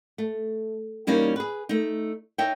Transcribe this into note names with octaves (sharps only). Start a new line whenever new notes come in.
A3
E2 G3 A#3 C#4 D#4
G#4 B4
A3 D#4
D#4 C#5 E5 G5